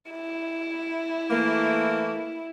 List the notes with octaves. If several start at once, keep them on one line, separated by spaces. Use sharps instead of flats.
E4
E3 A3 A#3